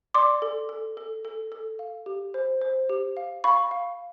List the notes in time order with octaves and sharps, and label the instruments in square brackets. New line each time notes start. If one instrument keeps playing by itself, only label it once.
[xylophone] D5 C6 D6
A4
A4
A4
A4
A4
F5
G4
C5
C5
G4
F5
F5 B5 C#6
F5